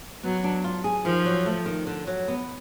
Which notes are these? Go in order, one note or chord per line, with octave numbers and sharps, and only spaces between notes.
F#3 B3
D4
F4
G#4
D#3 F3
F#3
A3
D#3
D3
F#3
B3